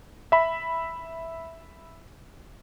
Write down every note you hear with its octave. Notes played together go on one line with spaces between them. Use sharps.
E5 B5